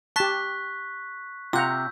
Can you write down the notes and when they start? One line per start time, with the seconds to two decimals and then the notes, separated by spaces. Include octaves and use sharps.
0.16 G4 A5 C#6 F#6 B6
1.53 C3 F4 F#5 A#5 E6 G6